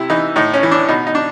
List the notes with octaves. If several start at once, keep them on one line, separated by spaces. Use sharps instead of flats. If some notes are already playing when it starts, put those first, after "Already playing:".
Already playing: C3 E4
E3 D#4
A2 D#4
C#4
E3
D4
B2 D#4
D#4
D4